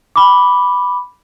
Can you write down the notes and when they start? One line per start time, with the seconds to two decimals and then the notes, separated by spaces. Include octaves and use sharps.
0.16 B5 D6